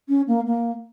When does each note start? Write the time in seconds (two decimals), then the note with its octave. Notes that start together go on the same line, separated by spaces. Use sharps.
0.08 C#4
0.27 A#3
0.46 A#3